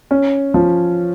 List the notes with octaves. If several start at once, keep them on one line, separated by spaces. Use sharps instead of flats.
C#4
F3